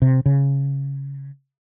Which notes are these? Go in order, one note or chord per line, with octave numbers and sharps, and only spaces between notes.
C3
C#3